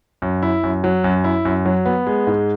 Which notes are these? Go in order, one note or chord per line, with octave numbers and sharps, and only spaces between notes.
F#2
E4
F#2
F#3
F#2
E4
F#2
F#3
B3
G#3
G#2